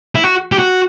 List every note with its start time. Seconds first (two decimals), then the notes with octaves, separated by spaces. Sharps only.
0.15 E4
0.24 F#4
0.52 G4
0.59 F#4